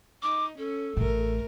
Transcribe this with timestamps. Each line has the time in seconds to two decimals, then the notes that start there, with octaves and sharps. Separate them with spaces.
0.23 D#4 D6
0.58 C#4 A4
0.97 A1 A2 A3 A#4